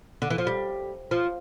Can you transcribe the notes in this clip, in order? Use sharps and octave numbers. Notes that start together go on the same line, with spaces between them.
D3
E3
F3
G3
F3